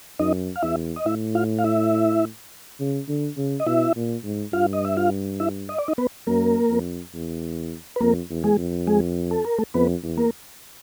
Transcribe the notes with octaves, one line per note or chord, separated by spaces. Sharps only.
F#2 D#4 D#5
F5
E2 E4 E5
D#5
A2 E4 E5
F4 F5
F5
E4 E5
C#3
D3
C#3
D#5
B2 E4 E5
A#2
G#2
G2 F4 F5
D#5
E5
F4 F5
E4 E5
D#5
D5
D#4 D#5
B3 B4
F#2 A#3 A#4
F2
E2
B4
F2 A#3 A#4
E2
G#3 G#4
F2
G#3 G#4
A4
A#4
A3 A4
F2 B3 B4
E2
A#3 A#4